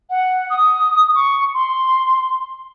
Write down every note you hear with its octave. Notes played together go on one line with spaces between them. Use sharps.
F#5
D#6
C#6
C6